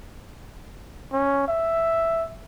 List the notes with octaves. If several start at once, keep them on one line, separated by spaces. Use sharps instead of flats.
C#4
E5